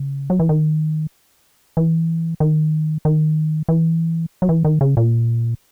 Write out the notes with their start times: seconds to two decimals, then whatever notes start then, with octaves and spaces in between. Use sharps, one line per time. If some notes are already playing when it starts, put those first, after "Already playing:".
Already playing: C#3
0.30 F#3
0.40 E3
0.49 D#3
1.77 E3
2.40 D#3
3.05 D#3
3.69 E3
4.42 F#3
4.49 E3
4.65 D#3
4.81 C#3
4.97 A#2